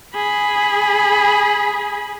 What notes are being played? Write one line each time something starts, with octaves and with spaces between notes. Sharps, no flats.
G#4 B5